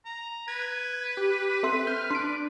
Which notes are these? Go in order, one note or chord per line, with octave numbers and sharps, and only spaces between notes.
A#5
B4 G#6
G4
C4 A4 E5 C6
F6 G6
D4 C6 D7